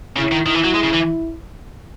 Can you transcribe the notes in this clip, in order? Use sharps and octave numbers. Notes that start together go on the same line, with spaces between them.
C#3 E4
D#3
D#3 E4
E3
F#3
G#3
C#3
E3